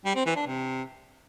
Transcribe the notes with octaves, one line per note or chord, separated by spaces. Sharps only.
G3
C4
E3
D4
C3